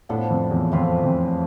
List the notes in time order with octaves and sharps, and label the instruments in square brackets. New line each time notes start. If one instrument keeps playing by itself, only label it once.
[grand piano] A2 [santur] F3 B3 D4 A4
[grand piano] F2
E2
[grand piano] F2 [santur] A3 C4 F4 B4
[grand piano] F2